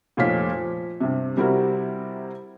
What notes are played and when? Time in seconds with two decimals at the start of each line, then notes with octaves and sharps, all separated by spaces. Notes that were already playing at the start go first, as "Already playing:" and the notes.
0.17 F1 A#2 F3 C#5 F5 B6
0.52 F3
1.00 G2 C3
1.37 C3 G3 C4 E4 F#4 A#4